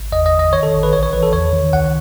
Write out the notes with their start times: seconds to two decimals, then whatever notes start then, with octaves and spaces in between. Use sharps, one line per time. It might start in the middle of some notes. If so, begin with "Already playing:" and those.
Already playing: G#1
0.12 E2 D#5
0.26 D#5
0.33 E2
0.39 D#5
0.53 D#3 C#5
0.63 A4
0.73 A1
0.83 B4
0.92 B1 C#5
1.03 C#5
1.13 E3 B4
1.23 A4
1.33 E2 C#5
1.53 D#3
1.73 C#2 F#5